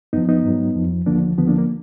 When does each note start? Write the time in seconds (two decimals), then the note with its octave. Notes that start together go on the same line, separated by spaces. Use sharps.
0.13 F#2 F3 B3 D#4
0.29 B3 D#4
0.44 G#2 F#3
0.75 F2 F3
1.06 D2 D3 F3 A#3 D4
1.38 D2 D3 F3 B3
1.48 A#3 D4
1.58 A#3